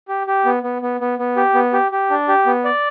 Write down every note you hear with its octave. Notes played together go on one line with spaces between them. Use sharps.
G4
G4
B3
B3
B3
B3
B3
G4
B3
G4
G4
D4
G4
B3
D5